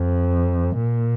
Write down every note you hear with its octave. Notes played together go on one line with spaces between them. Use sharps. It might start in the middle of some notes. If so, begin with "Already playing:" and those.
Already playing: F2
A#2